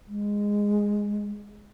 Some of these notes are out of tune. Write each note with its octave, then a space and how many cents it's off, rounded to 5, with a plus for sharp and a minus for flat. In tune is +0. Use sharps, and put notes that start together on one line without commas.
G#3 -10